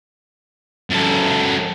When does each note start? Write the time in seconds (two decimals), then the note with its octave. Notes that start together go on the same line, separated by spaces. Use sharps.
0.90 F#2 A4